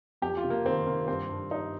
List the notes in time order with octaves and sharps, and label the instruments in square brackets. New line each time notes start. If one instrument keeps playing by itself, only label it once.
[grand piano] F2 G4
F4
C3
A#3
D#3 C4
C3 A#3
G2 C4
G2
G2 D#4